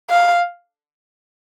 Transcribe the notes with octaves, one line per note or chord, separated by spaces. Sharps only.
F5